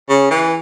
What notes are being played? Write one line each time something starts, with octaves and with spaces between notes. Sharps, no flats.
C#3
E3